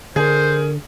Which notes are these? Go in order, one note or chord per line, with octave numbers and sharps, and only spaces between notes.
D3 G#4 A#4 C5